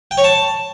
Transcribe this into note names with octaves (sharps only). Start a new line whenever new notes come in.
G5
C#5
A5